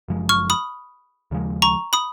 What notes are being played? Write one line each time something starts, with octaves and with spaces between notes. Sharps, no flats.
F#1 F#2 F3 G#3
C#6 F6
B5 D#6
D#2 C#3 F3 G#3
A#5 C#6
B5 D#6